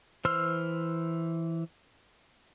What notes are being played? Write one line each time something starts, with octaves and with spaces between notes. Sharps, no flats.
E3 C5 C6 E6 F6